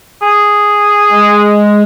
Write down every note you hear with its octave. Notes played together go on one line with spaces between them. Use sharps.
G#4
G#3